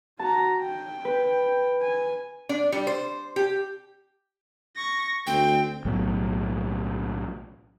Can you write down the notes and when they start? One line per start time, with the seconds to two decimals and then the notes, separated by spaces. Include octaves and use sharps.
0.19 F#4 A5 A#5
0.62 G5
1.05 B4
1.81 G#5
2.49 D4
2.72 G3
2.87 C5
3.36 G4
4.76 C#6 A#6
5.27 D2 C4 G5
5.85 B1 A2 F#3